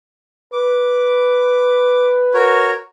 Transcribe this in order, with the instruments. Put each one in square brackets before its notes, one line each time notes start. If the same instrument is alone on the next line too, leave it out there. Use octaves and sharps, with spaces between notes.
[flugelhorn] B4 [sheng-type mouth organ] D6
[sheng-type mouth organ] F#4 A#4 C#5